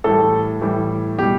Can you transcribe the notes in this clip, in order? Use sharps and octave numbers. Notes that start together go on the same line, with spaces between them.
A2 E3 G3 A4
A2 E3 G3
B2 G3 G4